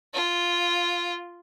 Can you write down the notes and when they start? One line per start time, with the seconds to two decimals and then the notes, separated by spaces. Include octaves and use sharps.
0.14 F4